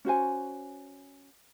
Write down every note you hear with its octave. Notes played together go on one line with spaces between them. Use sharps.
C#4 F#4 C5 G#5